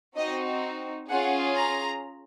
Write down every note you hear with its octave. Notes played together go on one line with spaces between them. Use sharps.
C4 D#4 F#4 D#5
C#4 F4 G#4 F#5
A#5